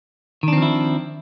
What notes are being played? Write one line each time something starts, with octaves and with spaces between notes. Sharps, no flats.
D#3 F3 C4 D4 E4